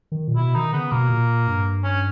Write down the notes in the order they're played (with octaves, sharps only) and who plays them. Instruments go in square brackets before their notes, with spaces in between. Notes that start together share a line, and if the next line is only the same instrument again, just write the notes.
[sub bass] D#3
A#2
[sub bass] B2 [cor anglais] E4
[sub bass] D#3 [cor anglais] D#4
[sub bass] C#3 [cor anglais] B3
[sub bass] B2 [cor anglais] A#3
[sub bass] A#2
G2
[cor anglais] C#4